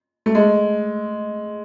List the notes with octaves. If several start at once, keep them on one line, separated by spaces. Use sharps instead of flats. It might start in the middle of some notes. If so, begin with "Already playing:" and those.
A3
G#3